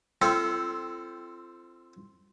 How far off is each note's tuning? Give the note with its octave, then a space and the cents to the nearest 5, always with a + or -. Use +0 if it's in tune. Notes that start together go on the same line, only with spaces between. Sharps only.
C4 +0 F4 -35 A4 +0